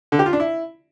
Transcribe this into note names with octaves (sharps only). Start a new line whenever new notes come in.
D3
G4
F4
D4
E4